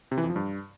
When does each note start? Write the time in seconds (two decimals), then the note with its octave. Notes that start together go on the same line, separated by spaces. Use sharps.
0.11 C3
0.18 E3
0.24 F2
0.30 F3
0.36 G2